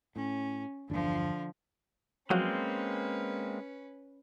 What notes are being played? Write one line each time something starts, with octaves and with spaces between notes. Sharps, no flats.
A2 C#4
G1 E2 D3 F3 D4
F3 F#3 G#3 A#3 C4 C#4 F#4 B4